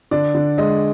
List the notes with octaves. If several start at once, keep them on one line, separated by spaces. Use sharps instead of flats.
D3 D5
D3
G#3 D#5